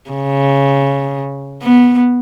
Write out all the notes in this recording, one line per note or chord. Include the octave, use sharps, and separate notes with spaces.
C#3
B3